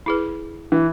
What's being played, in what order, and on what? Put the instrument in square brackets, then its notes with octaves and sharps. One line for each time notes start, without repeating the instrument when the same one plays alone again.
[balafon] E4 G#4 B4
[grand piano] E3